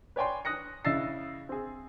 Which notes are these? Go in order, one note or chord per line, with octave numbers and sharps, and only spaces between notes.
B4 C#5 D5 G5 G#5 C6
D#6 F#6 A#6 C#7
C#3 E4 D#5 E6 A6 C7
C4 G#4